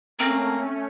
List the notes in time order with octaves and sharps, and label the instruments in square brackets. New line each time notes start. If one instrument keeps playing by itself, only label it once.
[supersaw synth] A3 C#4 [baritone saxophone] A#3 [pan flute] C4